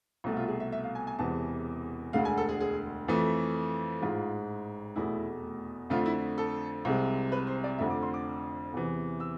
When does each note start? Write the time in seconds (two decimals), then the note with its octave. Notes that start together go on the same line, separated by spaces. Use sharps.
0.24 C2 B2 A3
0.37 F4
0.48 G#4
0.60 E5
0.72 E5
0.84 F5
0.95 G#5
1.07 G#5
1.19 E1 E2 C3 E3 A5
2.13 E1 D2 D3 G#3 F5
2.25 G#5
2.37 A4
2.49 G#4
2.60 G#4
3.08 F2 E3 A3
4.01 A1 G#2 G#3 F4
4.96 F1 E2 B2 A3 E4
5.90 F2 D3 A3 F4
6.06 E4
6.38 A4
6.85 C2 C3 G#3
7.32 B4
7.47 C5
7.64 D5
7.78 F1 F2 D3 E5
7.90 D6
8.03 C6
8.14 D6
8.73 E2 C3 E3
9.20 E6